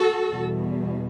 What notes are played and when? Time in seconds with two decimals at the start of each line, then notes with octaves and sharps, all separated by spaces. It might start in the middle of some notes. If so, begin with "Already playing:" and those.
Already playing: F#4 A4
0.30 E2 B2 G3